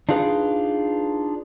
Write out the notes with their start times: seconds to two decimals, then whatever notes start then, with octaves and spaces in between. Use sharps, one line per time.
0.09 D4 D#4 F4 G#4 B4